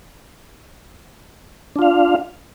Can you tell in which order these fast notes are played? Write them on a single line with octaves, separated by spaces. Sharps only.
D4 F4 F5